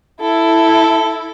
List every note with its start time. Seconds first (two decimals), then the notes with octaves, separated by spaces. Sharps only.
0.20 E4 A4